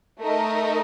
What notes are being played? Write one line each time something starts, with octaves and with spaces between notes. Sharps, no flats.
A3 D#4 A#4 D#5